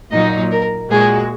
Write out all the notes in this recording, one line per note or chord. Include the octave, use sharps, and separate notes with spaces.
A#2 F#3 D#4 D#5
A#4
A#2 G#3 F#4 G#4